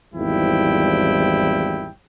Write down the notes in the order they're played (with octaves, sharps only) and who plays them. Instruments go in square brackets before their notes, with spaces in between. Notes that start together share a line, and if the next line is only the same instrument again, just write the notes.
[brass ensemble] G#1 E2 F3 G3 E4 G5